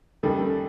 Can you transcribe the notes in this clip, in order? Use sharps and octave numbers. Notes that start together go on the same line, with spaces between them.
F#2 D#3 G3 A4